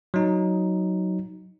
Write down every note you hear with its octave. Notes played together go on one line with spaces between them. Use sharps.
F#3 D#4